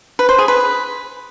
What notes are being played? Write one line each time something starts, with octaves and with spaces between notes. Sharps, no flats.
B4
C5
G#4
B4